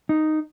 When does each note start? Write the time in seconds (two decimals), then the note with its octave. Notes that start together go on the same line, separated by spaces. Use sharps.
0.09 D#4